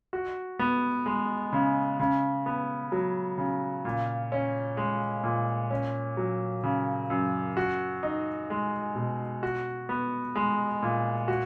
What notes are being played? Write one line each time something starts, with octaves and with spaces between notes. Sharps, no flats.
F#4
B3
G#3
C#3
C#3
B3
F#3
C#3
A#2
C#4
G#3
A#2
C#4
F#3
C#3
F#2
F#4
D#4
G#3
B2
F#4
B3
G#3
A#2
F#4